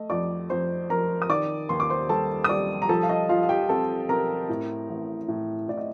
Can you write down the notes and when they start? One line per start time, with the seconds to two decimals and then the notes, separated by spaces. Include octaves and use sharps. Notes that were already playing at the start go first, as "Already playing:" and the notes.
Already playing: A3 D#5
0.10 F2 D5 D6
0.50 F2 C5 C6
0.90 F2 A#4 A#5
1.22 D#6
1.30 D#3 D5 D6
1.69 D#2 C6
1.80 D6
1.90 C5 C6
2.09 G3 A4 A5
2.44 D#6
2.49 G3 D5 D6
2.82 A#5
2.89 F3 A4 A5
3.03 F5
3.09 D#5
3.29 F3 F4 F5
3.43 F5
3.49 G4 G5
3.69 C4 A4 A5
4.09 C4 A#4 A#5
4.49 A2
4.89 A1
5.28 A2
5.69 A2 D5
5.78 D#5